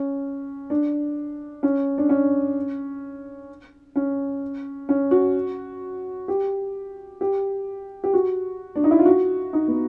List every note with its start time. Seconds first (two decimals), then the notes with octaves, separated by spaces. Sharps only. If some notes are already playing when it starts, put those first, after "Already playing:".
Already playing: C#4
0.70 D4
1.63 C#4
1.98 D4
2.09 C#4
3.96 C#4
4.89 C#4
5.11 F#4
6.28 G4
7.21 G4
8.04 G4
8.14 F#4
8.76 D4
8.84 D#4
8.91 E4
8.99 F4
9.06 F#4
9.53 D#4
9.68 B3